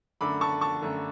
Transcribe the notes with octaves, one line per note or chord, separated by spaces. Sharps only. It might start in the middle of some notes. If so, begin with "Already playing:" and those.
F#2 D3 A3 B5 D6
A5 C#6
A5 C#6
F#2 D3 A3